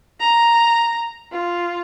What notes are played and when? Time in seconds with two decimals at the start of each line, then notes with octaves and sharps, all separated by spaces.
0.20 A#5
1.32 F4